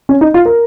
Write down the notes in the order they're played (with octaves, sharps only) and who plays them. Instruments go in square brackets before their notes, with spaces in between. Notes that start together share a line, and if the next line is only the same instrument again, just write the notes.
[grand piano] C#4
D#4
F4
A#4